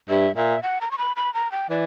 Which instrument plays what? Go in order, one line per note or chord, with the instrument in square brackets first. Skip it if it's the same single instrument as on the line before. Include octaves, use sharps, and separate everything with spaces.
[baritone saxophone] G2 [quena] E5
[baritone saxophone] A#2 [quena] E5
[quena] F#5
A#5
C#6
B5
B5
A#5
G5
[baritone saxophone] E3 [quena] D5